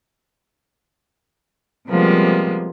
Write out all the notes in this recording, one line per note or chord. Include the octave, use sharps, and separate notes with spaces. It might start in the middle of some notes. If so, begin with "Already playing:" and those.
C3 F3 G3 G#3 A#3 B3